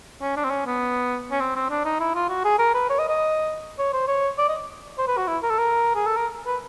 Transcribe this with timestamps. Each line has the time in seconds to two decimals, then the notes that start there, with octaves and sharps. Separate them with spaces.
0.21 C#4
0.36 D4
0.44 C4
0.50 C#4
0.66 B3
1.31 C#4
1.40 C4
1.56 C4
1.70 D4
1.85 D#4
2.00 E4
2.15 F4
2.29 F#4
2.45 G#4
2.59 A#4
2.74 B4
2.90 C#5
2.99 D#5
3.09 D#5
3.79 C#5
3.93 C5
4.08 C#5
4.38 D5
4.49 D#5
4.98 C5
5.07 B4
5.17 F#4
5.27 E4
5.43 A#4
5.50 A4
5.58 A#4
5.95 G#4
6.06 A4
6.16 A#4
6.46 B4